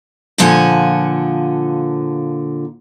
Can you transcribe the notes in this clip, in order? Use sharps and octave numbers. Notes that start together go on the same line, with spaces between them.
A#2 D3 F3 F#5 G#5